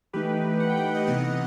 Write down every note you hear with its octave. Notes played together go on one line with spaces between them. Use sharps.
E3 A3 D#4 G4 B4
F#5
G5
F#5
G5
D#5 F#5
C3 E3 B3 D#4 D#5 F#5